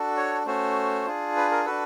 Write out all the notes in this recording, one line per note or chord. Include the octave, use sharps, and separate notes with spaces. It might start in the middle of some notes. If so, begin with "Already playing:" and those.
Already playing: D4 F#4 A4
C#5
A3 C#4 F#4 A4 C5
D4 F4 G#4
B4
A#4
D4 F#4 A4 B4